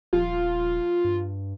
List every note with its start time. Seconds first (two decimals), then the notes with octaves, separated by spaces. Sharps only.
0.13 D#1 F3 F4
1.04 G2